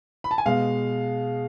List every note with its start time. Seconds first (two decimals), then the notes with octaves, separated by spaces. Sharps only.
0.24 B5
0.31 A5
0.38 G#5
0.46 B2 G#3 F5